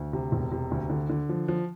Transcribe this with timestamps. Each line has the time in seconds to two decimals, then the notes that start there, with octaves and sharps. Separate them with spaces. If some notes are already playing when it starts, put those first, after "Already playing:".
Already playing: D2
0.13 C3
0.32 E1
0.52 C3
0.71 D2
0.90 D3
1.09 D3
1.29 F3
1.48 F3